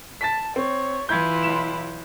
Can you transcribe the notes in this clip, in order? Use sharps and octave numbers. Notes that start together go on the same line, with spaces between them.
A5 A6 B6
C4 C#5
E3 E4 F4 G6 G#6
B1 C6 E7